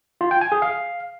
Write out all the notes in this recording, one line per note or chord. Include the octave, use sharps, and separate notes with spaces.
F4
G5
G#5
G#4
F5